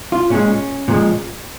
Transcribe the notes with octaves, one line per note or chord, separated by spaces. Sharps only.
F4
A#2 G#3 C#4
A#2 F3 G#3